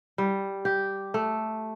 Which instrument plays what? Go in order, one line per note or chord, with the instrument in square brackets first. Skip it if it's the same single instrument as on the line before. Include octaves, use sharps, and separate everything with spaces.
[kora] G3
G4
A3